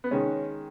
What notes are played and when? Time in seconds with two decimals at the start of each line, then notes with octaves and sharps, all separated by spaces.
0.04 B3
0.11 D#3 G#3 C#4